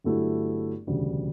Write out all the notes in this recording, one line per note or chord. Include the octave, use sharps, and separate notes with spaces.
G1 G2 F#3 A3 E4
E1 D2 C#3 G3